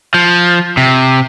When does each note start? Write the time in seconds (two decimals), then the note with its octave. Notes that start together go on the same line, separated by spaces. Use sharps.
0.14 F3
0.77 C3